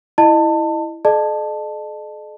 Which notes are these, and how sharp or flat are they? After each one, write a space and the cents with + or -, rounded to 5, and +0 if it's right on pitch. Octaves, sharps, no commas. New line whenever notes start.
E4 +0 D#5 -20 A5 +25
A4 -45 D#5 -45 A5 +0